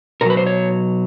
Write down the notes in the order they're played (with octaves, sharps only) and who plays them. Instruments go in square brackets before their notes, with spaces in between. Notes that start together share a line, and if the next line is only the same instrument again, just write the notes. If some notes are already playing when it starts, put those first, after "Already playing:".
[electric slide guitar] B2 F#3 A#4
B4
C5
C#5